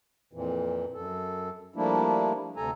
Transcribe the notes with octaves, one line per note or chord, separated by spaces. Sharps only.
F2 A#2 E3
F#2 A4
F3 G3 A3 A#3 D4 E4
D2 C3 A4 G#5 A#5